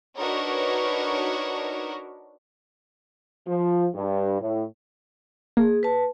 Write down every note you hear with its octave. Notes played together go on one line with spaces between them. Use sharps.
D4 D#4 F#4 A#4 B4 C#5
F3
G2
A2
A#3 G#4
B4 A5